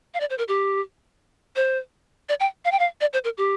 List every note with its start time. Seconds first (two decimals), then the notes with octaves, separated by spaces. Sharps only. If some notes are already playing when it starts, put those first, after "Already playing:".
0.14 F5
0.20 D5
0.30 C5
0.38 A#4
0.48 G4
1.56 C5
2.29 D5
2.40 G5
2.65 F5
2.71 G5
2.79 F5
3.01 D5
3.13 C5
3.24 A#4
3.37 G4